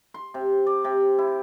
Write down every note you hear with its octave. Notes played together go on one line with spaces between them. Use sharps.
C6
C3
D5
C3
E4